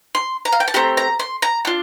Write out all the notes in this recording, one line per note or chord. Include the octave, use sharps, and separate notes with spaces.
C6
A#5
F5
G5
A5
A3 C4 G4 A#5
A#5
C6
A#5
D4 F4